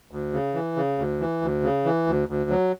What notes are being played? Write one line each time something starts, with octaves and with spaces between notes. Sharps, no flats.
D2
C#3
E3
C#3
D2
E3
D2
C#3
E3
D2
D2
F#3